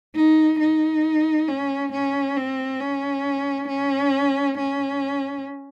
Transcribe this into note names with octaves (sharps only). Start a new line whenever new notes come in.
D#4
D#4
C#4
C#4
C4
C#4
C#4
C#4